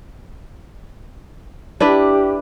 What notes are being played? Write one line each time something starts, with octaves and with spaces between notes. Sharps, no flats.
D4 E4 G4 B4